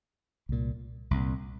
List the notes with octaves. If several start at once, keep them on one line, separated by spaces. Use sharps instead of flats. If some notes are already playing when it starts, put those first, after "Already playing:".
C2 A#2
C2 A#2